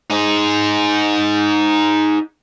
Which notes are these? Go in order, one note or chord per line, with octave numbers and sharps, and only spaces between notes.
D#4 G#4